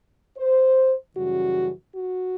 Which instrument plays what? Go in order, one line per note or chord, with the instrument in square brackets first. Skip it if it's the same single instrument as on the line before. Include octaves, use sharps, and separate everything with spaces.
[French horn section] C5
F#2 C#3 E3 G3 F#4
F#4